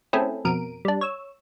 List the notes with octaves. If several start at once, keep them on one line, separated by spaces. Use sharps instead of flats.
A3 C4 C#4 E4 G#4 A4
F2 B2 A#4 D7 D#7
G3 D4
C#5 E6